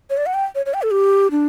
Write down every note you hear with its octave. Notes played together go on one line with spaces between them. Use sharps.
C#5
D5
F#5
G5
C#5
C#5
G5
A4
G4
D4